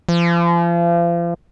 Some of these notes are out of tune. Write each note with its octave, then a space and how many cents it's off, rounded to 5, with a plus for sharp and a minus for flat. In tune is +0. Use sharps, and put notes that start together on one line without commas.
F3 -35